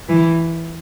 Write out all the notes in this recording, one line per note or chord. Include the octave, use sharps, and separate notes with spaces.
E3